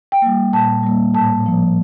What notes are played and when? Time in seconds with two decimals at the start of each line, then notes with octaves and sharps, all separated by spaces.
0.12 G5
0.22 G3 A#3
0.53 A#2 A5
0.83 G3 A#3
1.14 A2 A5
1.46 F3 A#3